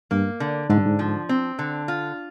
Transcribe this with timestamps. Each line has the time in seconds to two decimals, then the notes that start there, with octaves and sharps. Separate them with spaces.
0.11 G2 A#3
0.40 D3
0.70 G#2 D3
0.78 G2
0.86 G#2
0.99 F3
1.29 C4
1.59 D3
1.88 F4